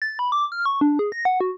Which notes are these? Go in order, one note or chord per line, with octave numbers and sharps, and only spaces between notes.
A6
B5
D6
F6
C#6
D4
G#4
A#6
F#5
F#4